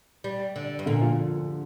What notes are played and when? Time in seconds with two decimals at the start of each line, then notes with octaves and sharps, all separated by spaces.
0.24 G3
0.56 D3
0.79 G2
0.86 A#2 D3
1.01 F3